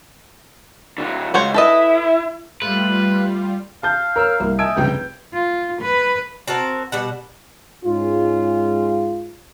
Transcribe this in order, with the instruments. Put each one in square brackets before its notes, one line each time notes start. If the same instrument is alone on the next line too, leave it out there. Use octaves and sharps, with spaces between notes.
[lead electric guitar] D3 F#3
[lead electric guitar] C#2 [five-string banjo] F#4 C5 C#5
[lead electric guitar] E4 [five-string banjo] A4 B4 D#5
[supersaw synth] G3 F4 [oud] A3 [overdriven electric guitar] B4
[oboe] F5 [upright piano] A5 G6
[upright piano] A#4 [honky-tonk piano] C#5 E6 F6
[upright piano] C2 [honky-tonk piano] A#3
[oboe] D#5 [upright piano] E5 A5 D7 [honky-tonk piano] G#5 E6 G#6
[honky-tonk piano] F1 C#2 G2 [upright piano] B4 [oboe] G5
[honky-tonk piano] G6
[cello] F4
B4
[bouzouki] C4 F#4 A#4 A5
B2 G3 F#5
[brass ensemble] G#2 G#3 C#4 F4